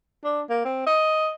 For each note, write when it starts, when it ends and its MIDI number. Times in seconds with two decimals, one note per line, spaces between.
0.25 0.41 62
0.50 0.62 58
0.65 0.83 60
0.87 1.31 75